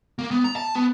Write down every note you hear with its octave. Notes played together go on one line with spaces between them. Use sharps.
A#3
B3
A#5
A5
B3